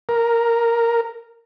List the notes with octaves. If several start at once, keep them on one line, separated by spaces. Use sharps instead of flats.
A#4